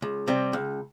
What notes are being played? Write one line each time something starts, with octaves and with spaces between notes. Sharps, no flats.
C#2
C3 G3 C4
C#2